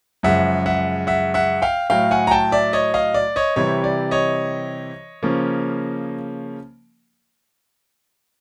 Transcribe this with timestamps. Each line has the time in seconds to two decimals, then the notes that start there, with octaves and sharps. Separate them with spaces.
0.23 F#2 C#3 F3 G#3 E5 F#5
0.66 E5 F#5
1.07 E5 F#5
1.34 E5 F#5
1.62 F5 G5
1.90 A2 F#3 A3 F5 G5
2.11 F#5 G#5
2.27 A#5
2.31 G5 A5
2.52 D5 E5
2.73 C#5 D#5
2.94 D#5 F5
3.14 D5
3.36 C#5 D#5
3.56 C3 E3 G3 C4 C#5
3.84 D5
4.11 C#5 D#5
5.23 C#3 F3 A#3 C#4